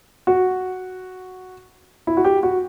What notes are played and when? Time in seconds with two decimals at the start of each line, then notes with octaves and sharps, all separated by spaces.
0.27 F#4
2.07 E4
2.17 F#4
2.25 G4
2.43 F#4